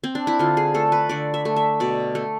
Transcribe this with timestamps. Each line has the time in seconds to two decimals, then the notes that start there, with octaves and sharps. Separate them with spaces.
0.04 C4
0.15 D4
0.27 E4
0.39 D3 F4
0.57 G#4
0.74 A3 A4
0.92 B4
1.09 D3 D5
1.34 E5
1.45 A3
1.56 E5
1.80 B2 D5
2.15 A3